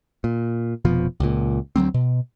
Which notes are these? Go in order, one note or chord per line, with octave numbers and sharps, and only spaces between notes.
A#2
F1 B2 F3
C#2 A#2
D2 F#3 A#3 C4
B2